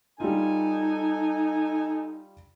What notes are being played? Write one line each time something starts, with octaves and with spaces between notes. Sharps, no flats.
G3 D#4 F4 A4 G#5